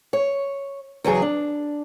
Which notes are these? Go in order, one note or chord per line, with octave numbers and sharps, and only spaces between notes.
C#5
E2 C#3 F#3 G#4
D4